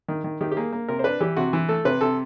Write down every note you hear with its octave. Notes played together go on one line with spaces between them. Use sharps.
D#3
D#3
D#3 G4
G4
A#3 G#4
A#3
C3 A#4
C5
D4 B4
E3 G4
C3 F#4
E3
A3 A4
C3 B4
C3 A4